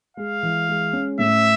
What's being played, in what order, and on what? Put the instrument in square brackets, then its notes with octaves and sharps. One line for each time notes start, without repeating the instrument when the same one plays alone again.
[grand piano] G#3 [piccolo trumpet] F5
[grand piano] E3
G#3
C#4
[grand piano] A2 [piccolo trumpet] E5